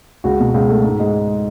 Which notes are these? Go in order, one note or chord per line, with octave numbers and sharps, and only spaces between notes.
C#2 F#4
B2
C#2
A3
G#2
G#3